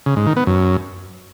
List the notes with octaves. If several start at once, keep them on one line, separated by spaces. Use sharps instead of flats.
C#3
G#2
D#3
B3
F#2